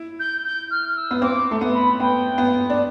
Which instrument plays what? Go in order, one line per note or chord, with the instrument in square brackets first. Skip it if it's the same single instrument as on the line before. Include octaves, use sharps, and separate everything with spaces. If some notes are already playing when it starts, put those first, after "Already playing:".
Already playing: [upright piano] E4
[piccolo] G6
G6
F6
F6
E6
[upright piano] B3
[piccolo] E6
[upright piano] C4 [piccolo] D6
[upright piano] A3
B3
[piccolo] B5
[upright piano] B3 [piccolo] G5
[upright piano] B3
D4